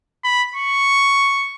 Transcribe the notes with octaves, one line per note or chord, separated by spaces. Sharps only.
B5
C#6